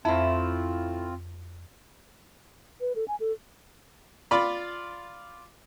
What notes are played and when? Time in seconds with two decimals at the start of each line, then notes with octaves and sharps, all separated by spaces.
0.05 F2 A2 C4 E4 F4
2.81 B4
2.96 A4
3.08 G#5
3.20 A4
4.31 F4 D5 B5